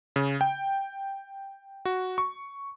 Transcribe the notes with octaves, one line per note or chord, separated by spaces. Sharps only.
C#3
G5
F#4
C#6